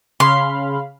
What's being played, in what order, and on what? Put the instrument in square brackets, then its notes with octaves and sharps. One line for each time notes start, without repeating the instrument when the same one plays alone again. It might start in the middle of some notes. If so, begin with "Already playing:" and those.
[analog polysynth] C#3 F5 B5 [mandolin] C6